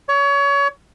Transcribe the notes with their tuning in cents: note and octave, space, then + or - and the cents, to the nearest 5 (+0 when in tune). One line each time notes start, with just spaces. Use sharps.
C#5 +30